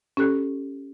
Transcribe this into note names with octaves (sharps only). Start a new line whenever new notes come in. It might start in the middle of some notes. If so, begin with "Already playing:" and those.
C#4 G4 A4 F#6